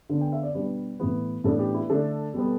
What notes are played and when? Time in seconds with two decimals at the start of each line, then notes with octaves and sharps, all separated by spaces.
0.09 D3 B3 D4
0.21 G5
0.33 E5
0.43 D5
0.54 B2 G3 D4 B4
1.00 A2 E3 B3
1.44 A2 E3 B3 D4 A4
1.59 G4
1.74 E4
1.90 D3 A3 D4 A4
2.34 B2 G3 B3